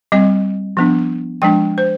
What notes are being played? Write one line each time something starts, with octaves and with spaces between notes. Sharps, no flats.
G3 C4 D#5
F3 B3 D4
F3 G#3 D4 G5
C5